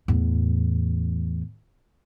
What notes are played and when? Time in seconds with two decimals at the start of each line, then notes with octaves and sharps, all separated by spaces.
0.08 E2 A2